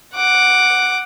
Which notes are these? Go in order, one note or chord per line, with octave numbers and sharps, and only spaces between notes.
F#5 D6